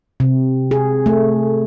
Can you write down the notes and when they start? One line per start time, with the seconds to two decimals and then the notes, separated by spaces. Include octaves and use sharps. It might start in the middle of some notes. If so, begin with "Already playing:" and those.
0.20 C3
0.71 G#4
1.06 A3